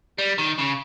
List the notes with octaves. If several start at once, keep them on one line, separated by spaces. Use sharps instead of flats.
G3
D#3
C#3